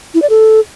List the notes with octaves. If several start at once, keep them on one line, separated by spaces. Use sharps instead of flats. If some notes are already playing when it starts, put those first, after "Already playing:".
E4
D5
A4